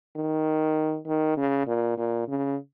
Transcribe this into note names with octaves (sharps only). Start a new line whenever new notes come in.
D#3
D#3
C#3
A#2
A#2
C#3